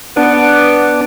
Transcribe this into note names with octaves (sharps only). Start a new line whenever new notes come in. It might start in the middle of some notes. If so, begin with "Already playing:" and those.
B3 D4